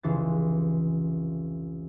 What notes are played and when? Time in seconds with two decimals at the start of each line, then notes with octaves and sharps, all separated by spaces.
0.03 F1 C#2 E3 C5 A6